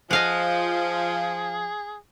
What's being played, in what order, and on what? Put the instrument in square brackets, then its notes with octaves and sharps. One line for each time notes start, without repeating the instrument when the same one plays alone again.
[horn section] F3 [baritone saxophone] G#4 [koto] D#5 F5 F#5